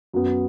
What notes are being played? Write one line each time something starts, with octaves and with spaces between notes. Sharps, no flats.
F#2 F#3 B3